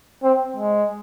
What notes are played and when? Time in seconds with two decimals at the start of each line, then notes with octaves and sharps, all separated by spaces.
0.23 C4
0.56 G#3